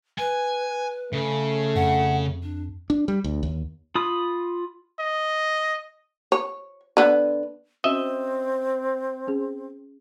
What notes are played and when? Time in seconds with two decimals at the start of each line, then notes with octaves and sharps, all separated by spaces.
0.19 B4 G#5
1.13 C#3 A3
1.76 F2 F#5
2.42 D4
2.90 D4
3.08 G3
3.24 D2
3.43 D#2
3.95 F4 B5 D#6
5.00 D#5
6.32 C#5
6.97 D3 B3
7.84 C4 C#4 F#4 C5 D#5 E5
9.27 C#4 G#4